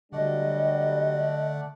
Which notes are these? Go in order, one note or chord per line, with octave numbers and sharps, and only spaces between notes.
D3 F#3 G3 A3 D4 D5 D#5 F#5